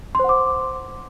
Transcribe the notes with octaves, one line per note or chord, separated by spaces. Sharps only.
C5 F#5 C6 D6